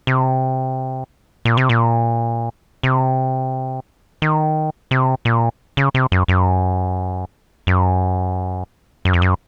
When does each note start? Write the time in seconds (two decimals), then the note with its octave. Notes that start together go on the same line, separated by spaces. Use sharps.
0.07 C3
1.45 A#2
1.57 C3
1.69 A#2
2.83 C3
4.22 D#3
4.91 C3
5.25 A#2
5.77 C#3
5.94 C3
6.12 F#2
6.28 F#2
7.67 F#2
9.05 F#2
9.13 F2
9.22 F#2